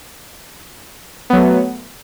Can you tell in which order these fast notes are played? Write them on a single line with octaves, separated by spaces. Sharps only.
B3 F#3 A3